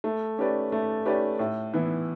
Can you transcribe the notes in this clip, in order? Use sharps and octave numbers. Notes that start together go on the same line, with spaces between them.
A3
C#4 G4 B4 D5
A3
C#4 G4 B4 D5
A2
E3 B3 E4